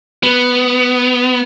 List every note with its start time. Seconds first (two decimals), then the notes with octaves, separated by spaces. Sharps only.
0.23 B3